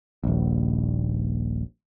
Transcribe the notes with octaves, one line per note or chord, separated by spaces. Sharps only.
D#1 A#1